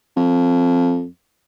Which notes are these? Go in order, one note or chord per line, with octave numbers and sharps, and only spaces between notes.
F2